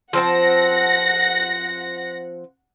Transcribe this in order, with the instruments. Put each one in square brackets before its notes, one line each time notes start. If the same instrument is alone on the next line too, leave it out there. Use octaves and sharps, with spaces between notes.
[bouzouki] F3 C4 A5 [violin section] F#5 A#6